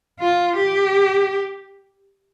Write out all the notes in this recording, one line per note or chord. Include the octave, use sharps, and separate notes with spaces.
F4
G4